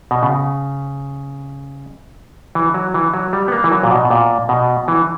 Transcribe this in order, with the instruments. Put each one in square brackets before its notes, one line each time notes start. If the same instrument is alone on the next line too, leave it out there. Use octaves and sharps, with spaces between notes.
[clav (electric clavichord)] B2
C#3
E3
F#3
E3
F#3
G3
B3
A#3
E3
F#3
A#2
B2
A#2
B2
E3